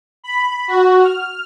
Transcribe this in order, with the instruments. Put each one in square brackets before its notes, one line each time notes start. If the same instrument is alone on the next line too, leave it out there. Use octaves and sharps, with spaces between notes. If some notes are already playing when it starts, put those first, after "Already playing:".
[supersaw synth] B5
F#4
F6